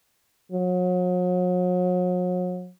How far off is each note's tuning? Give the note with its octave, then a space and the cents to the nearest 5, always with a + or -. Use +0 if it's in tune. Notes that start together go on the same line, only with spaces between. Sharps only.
F#3 -40